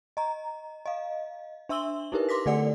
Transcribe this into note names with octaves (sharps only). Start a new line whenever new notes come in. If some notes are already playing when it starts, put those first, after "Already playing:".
D#5 A#5
D#5 F5
D4 E5 C6 E6 F#7 G7
D#4 E4 G4 A#4 B4
C6 D6 A#6 B6
D3 A3 A4 D5 F#5 C#7